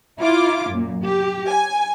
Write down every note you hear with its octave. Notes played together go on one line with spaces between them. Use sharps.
E4 F4 D6
F#2 A#2
G4
G#5